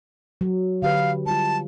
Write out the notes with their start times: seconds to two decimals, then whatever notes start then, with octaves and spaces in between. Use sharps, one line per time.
0.41 F#3
0.82 D3 G4 B4 F5
1.26 G3 F4 A5